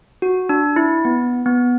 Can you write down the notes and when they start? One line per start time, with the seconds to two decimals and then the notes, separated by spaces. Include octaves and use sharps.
0.22 F#4
0.49 D4
0.76 E4
1.05 B3
1.46 B3